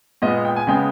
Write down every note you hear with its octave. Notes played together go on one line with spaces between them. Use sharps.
A#2 G#3 B3 D#5
G5
G#5
C#3 G#3 B3 G5